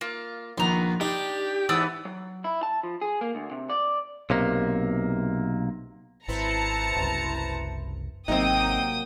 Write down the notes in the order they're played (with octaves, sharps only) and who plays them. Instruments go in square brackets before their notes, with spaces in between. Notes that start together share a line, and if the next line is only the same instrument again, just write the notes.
[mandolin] A#3 [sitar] F4
[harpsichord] A#1 [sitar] D#3 B3 [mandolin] A#5 C6
[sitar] D4 [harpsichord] D#4 [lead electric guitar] G4
[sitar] G#2 E3 B3 [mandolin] D5 D#6 E6
[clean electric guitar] F#3
E4
A5
F3
G#4
A#3
D2
C3
D5
B1 C3 A#3
[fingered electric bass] G#1 [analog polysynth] E4 B4 C5 [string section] A5 A#5 C#7
[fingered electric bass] F#1 C2
[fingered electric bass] G#1 [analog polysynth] C3 F#3 A#3 [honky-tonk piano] C4 D#4 [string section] G5 D#6